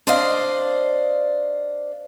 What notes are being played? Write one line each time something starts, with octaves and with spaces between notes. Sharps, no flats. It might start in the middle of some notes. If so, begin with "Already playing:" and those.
D4 C5 D5 D#5 F5